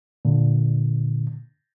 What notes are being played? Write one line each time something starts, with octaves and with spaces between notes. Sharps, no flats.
A#2 D3